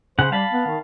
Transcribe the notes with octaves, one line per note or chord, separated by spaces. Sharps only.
C#3 C5 F#5
G3 F5 A5 B5
B3
D#3